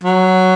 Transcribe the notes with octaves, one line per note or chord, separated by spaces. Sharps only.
F#3